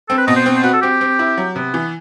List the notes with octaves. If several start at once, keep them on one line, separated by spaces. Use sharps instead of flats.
C4 A4
B4
B2 D#5
C5
C4
C5
F#4 B4
A4
C4 G4
C4
E4
F#3
C3 B3
E3